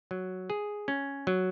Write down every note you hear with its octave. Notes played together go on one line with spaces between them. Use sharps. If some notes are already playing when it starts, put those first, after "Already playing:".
F#3
G#4
C#4
F#3